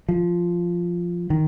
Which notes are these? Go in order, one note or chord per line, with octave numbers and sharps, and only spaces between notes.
F3
D#3